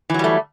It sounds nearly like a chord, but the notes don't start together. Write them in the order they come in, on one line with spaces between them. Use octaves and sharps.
E3 F#3 G3 A3